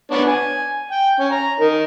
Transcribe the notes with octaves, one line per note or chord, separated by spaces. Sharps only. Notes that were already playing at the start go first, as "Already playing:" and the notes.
B3 D4 C#5
G#5
G5
C#4
A#5
D#4 A#4